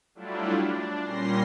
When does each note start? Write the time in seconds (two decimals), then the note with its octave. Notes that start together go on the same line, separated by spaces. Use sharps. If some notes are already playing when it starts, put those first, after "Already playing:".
0.15 F#3 G3 A3 D4 E4 F4
0.62 D4
1.00 A#2 G3 C#4 C6 A#6 C7